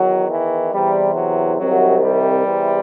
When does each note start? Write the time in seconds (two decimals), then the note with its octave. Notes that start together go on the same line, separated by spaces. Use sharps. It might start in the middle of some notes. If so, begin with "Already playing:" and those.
Already playing: E2 D#3 F#3
0.30 E3
0.72 E2 C3 E3 G3
1.15 F#3
1.58 C2 C3 D#3 F#3
2.01 G3
2.44 E2 C3 E3